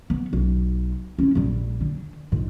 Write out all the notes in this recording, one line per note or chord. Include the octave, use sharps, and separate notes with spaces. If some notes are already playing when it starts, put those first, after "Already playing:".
B3
B1
C#4 E4
A#1 G3
D3
A#1 G#2